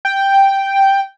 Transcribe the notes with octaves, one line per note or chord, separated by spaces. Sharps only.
G5